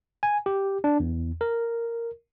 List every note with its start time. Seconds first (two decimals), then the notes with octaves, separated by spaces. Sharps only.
0.23 G#5
0.46 G4
0.84 D4
1.00 E2
1.41 A#4